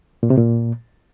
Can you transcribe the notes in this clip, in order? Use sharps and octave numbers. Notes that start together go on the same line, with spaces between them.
A#2
C3
A#2